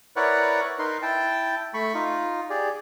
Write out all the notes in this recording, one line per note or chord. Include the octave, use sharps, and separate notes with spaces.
E4 A#4 B4 C#5 D5 F#5
D#4 A#4 B4 C6
E4 G5 A5
A3 B5 C#6
D#4 F4
G4 G#4 D5